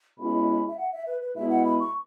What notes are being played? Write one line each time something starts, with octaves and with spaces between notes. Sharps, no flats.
B2 G#3 C#4 E4 B5
E5
F#5
E5
B4
B4
B2 G#3 E4 E5
F#5
B5
C#6